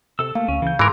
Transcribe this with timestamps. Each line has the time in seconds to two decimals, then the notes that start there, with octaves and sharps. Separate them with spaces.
0.19 C3 A4 E6
0.35 A3 A#3 F5
0.48 D2 C#4
0.62 C#3 E3 G6
0.79 G#2 E3 G#4 A#4 A#5 C6 D6